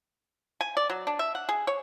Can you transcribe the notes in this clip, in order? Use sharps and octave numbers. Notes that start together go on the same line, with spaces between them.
G#5
D5
F#3
D4
E5
F#5
G#4
C#5